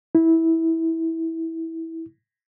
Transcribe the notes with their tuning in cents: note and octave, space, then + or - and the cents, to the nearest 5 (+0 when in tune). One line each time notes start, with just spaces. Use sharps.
E4 -15